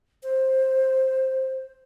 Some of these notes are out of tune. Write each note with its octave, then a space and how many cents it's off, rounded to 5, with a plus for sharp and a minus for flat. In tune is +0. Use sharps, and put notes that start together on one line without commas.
C5 +10